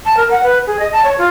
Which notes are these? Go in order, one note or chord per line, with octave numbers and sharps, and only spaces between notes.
A5
A#4
F#5
B4
G#4
D#5
A5
C#5
F4